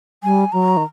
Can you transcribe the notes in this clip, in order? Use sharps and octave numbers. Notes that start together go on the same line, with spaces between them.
G3 G#5
F#3 A#5
D#3